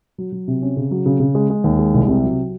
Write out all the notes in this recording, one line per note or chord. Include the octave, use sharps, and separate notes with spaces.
F#3
F#3
C3
C#4
C#3
F#3
C#3
C#3
G#3
G#3
D#2
G#3
C2
C3
F#3